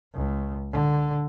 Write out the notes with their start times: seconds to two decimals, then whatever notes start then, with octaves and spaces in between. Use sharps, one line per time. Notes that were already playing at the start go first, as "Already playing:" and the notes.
0.13 C#2
0.72 D3